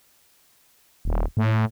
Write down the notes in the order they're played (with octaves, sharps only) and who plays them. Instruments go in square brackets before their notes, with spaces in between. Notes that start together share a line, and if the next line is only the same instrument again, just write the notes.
[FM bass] D#1
A2